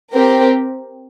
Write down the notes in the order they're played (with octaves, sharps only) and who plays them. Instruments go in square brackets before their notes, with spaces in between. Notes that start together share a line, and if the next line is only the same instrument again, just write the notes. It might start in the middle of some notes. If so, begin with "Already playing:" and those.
[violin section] C4 G4 A#4